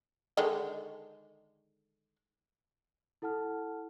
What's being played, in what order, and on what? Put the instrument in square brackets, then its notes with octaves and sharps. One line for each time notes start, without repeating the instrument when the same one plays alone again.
[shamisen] D3 D#3 G#3
[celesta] E4 A4 F#5 A5 F6